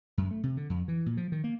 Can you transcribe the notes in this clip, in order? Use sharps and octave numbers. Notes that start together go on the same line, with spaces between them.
F#2
A3
C3
D3
F2
E3
A#2
F3
D#3
A#3